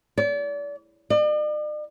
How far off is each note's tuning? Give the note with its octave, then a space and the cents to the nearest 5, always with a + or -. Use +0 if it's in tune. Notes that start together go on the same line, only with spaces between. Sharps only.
D5 -35
D5 +45